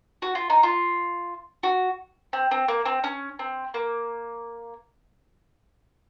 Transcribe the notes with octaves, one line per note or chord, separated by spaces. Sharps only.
F#4
F4
D#4
F4
F#4
C4
C4
A#3
C4
C#4
C4
A#3